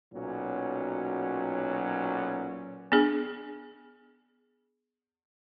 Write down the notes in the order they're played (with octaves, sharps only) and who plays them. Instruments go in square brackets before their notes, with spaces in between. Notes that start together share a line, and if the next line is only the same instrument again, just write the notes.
[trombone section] B1 A#2 F#3 C#4
[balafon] B3 D4 G#4